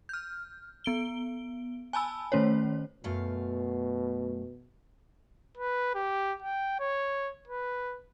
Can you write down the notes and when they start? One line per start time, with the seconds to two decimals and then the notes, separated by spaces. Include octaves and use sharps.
0.09 F6 G6
0.84 B3 D7 G7
1.93 G#5 A5 B5 E6
2.32 D#3 A3 C#4 C5 C#5
3.04 F#2 B2 A3 F5
5.57 B4
5.95 G4
6.42 G5
6.80 C#5
7.48 B4